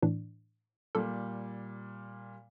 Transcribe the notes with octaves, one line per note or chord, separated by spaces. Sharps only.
A2 E3 D4
A#2 G3 A4